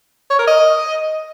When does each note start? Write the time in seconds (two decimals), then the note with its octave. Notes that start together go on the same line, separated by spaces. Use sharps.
0.30 C#5
0.39 A#4
0.47 D#5